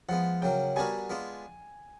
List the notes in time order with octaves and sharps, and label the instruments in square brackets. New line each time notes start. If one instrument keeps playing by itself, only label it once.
[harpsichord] F3 G#3 B3 [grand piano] F#5
[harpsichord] C#3 F#3 A#3 [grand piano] G5
[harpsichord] G3 B3 D4 F#4 A#4 [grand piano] G#5
[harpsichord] G#3 B3 D4 F4